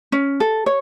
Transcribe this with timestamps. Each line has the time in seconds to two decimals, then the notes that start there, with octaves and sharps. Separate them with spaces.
0.12 C#4
0.40 A4
0.66 C#5